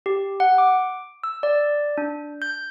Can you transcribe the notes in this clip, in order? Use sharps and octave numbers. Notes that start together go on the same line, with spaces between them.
G4
F#5
D6
E6
D5
D4
G6